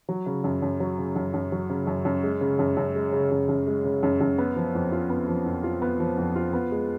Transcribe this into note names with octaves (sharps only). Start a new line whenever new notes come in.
F#3
C#3
F#2
F#2
F#3
C#3
F#2
F#2
F#3
C#3
F#2
F#2
G#3
C#3
F#2
F#2
G#3
C#3
F#2
F#2
G#3
C#3
F#2
F#2
B3
F3
F2
F4
B3
F3
F2
F4
B3
F3
F2
F4
B3
G#3